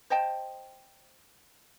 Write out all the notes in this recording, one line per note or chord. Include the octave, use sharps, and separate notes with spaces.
C5 D#5 G5 A5